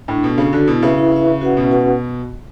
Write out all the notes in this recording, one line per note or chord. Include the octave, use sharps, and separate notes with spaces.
A2 D4
B2 F#4 A4
C#3 D4
D3 F#4 A4
B2 E4
C#3 B4 E5
E4
B4 E5
C#4
F#4 B4 F#5
B2 C#4
F#4 B4 F#5